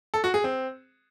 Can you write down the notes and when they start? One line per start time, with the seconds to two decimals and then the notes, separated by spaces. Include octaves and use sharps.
0.14 A4
0.24 F#4
0.34 G#4
0.44 C4